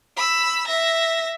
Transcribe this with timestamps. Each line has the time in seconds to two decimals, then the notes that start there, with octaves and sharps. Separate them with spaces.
0.17 B5 E6
0.67 E5 A#6